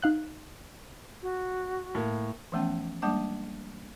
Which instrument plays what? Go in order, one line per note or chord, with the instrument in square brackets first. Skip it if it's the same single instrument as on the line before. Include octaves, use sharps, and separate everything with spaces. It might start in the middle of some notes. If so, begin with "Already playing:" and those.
[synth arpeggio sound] D#4 F5 F#6
[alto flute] F#4
[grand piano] A2 A#3
[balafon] E3 F3 A3 B3 C#4 G5
G3 G#3 A#3 D4 A5 D6